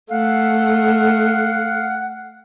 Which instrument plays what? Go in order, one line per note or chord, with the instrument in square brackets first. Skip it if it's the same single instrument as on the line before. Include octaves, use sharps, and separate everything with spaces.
[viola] A3 [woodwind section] F5 F#5